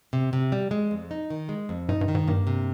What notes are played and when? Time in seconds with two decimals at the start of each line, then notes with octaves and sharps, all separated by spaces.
0.13 C3
0.33 C3
0.52 G3
0.71 G#3
0.91 F2
1.11 D#4
1.30 D#3
1.49 G#3
1.69 F2
1.89 G2 D#4
2.01 G2
2.08 D#3
2.15 G#2
2.28 G2 A#3
2.47 C3